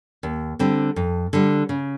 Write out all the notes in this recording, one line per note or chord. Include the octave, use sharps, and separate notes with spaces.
D#2
D3 G3 C4
F2
D3 G3
C#3